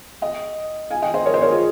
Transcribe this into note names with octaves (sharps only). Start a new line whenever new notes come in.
D#5 G5
F5 G#5
D#5 G5
C5 D#5
A#4 C#5
C5 D#5
A#4 C#5
F4 G#4